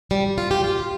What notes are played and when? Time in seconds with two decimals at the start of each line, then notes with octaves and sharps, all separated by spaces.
0.11 G3
0.38 F4
0.51 G4
0.64 F4